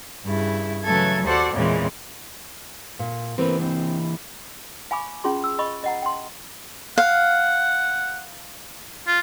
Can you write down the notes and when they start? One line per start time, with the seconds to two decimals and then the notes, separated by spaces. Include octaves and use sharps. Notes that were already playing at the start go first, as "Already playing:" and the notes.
0.25 G2 C#3 E4
0.84 C#3 E3 F#3 A3 A4 G#6
1.24 D#2 F#4 A4 C5 D5 F#5
1.53 E2 A#2 C#3 E3 G#3 C4
2.99 A#2
3.38 E3 A#3 C4 A#4 B4
3.61 C4
4.91 F5 G#5 B5 C#6 D6
5.24 C#4 F4 G#4 C6
5.44 E6
5.59 D#5 B5 C#6
5.84 D#5 F#5 A#5
6.02 G5 C6
6.98 F5 F#5
9.07 F4